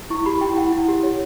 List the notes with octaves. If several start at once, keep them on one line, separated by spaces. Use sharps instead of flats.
E4 C#6
G4 B5
E4 G5
E4 F#5
E4
G4
C#5